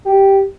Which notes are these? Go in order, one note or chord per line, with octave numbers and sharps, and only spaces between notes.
G4